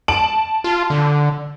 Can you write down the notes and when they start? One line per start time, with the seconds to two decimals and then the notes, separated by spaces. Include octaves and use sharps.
0.08 A5 D7 F#7
0.64 F4
0.90 D3